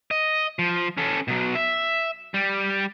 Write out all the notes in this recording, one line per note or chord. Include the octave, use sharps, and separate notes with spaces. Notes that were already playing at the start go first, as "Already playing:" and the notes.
D#5
F3
C#4 A4
B2 F#3
E5
G3